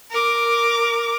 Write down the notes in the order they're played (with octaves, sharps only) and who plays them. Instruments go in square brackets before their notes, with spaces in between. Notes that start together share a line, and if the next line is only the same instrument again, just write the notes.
[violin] A#4 D6